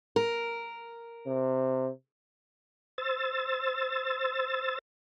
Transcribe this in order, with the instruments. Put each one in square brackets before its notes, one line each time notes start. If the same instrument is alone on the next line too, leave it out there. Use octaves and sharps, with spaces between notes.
[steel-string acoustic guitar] A#4
[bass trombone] C3
[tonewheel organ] C5 E6 A6